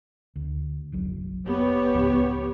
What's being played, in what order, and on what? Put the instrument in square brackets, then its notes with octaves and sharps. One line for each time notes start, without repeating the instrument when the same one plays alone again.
[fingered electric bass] D2
F#1 B1 F#3
[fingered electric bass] F1 [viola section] B3 G4 C#5
[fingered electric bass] C#2 A2 F3